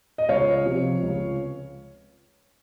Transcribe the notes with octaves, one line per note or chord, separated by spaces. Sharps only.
D#5
C#2 C#5 F5
C3 F3
C#2